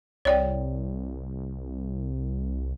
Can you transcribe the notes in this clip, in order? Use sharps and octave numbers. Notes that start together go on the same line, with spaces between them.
C2 C#5 D5 G5